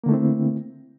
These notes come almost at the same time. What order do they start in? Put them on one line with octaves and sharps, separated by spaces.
A#3 D3 A3 E4 C4